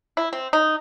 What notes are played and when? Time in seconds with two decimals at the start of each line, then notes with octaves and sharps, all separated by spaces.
0.17 E4
0.33 C4
0.53 D#4